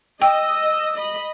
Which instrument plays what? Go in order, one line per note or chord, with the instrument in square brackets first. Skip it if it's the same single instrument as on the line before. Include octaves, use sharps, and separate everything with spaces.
[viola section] D#5 [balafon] G5 [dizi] E6
[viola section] D#5 B5